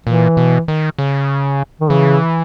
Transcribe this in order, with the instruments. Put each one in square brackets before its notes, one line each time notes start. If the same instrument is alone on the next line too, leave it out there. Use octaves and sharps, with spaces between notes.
[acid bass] A#2 [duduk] E3
[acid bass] B2
D#3
C#3
[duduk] D#3
[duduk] C#3 [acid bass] E3